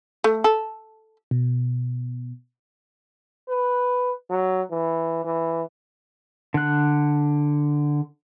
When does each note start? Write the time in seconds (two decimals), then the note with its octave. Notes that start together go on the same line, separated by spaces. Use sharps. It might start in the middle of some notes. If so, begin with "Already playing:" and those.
0.24 A3
0.44 A4
1.31 B2
3.49 B4
4.30 F#3
4.71 E3
5.25 E3
6.54 D3 F#6